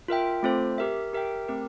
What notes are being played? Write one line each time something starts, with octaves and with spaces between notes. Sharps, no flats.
F4 A#4 E5 G5
A3 C4 F4 A4 C5
G4 A#4 E5
G4 A#4 E5 G5
A3 C4 G4 A#4